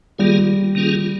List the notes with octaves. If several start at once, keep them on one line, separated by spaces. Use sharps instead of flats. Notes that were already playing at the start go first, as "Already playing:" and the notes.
D#3 G3 A#3 F4 G#4
D#3 A#3 C#4 F4 G#4